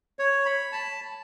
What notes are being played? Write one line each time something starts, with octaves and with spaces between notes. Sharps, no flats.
C#5
B5
A5